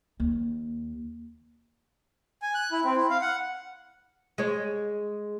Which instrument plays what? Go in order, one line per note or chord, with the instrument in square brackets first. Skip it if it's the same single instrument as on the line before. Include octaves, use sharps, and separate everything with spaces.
[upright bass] D#2
[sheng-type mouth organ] G#5
F#6
E4
C4
E4
F5
F#5
[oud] G#3 C#5